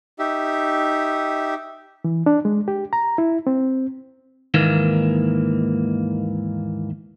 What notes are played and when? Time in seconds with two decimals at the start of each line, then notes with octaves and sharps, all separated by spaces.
0.19 D#4 G4 E5
2.04 E3
2.26 D4
2.45 G#3
2.68 G4
2.93 A#5
3.18 E4
3.47 C4
4.54 D#2 G#2 D#3 E3 A#3